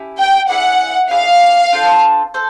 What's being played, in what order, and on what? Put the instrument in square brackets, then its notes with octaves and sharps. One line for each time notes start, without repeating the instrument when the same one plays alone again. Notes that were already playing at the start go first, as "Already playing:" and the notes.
Already playing: [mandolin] C#4 E4 G4
[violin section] G5
[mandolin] E4 G#4 B4 D5 [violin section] F#5
[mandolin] E4 G#4 B4 D5 [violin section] F5
[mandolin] D4 F4 A4 C5
A4 C5